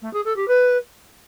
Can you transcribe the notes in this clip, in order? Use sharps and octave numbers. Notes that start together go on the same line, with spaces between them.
A3
G#4
A4
G4
B4